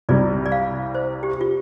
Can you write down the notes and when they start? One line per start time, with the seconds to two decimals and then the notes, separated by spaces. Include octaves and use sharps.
0.09 C2 C3 G3 D5
0.46 D5
0.52 F5
0.94 C5
1.23 G4
1.41 F4